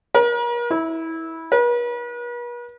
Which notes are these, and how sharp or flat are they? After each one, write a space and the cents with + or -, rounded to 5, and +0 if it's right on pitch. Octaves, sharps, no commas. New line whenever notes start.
A#4 +40
E4 -20
B4 -45